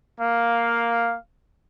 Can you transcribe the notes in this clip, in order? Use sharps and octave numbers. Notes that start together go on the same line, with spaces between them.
A#3 F5